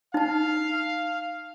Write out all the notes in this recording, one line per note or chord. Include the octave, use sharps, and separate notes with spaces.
D#4 F5 A5